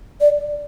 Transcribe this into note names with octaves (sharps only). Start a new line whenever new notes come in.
D5